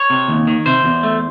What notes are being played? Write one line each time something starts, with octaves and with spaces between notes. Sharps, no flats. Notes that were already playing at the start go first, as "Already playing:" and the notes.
Already playing: C#5
C3
D#2
D#3
C3 C5
E2
A3